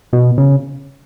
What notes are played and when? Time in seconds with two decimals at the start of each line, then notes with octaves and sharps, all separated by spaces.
0.13 B2
0.38 C#3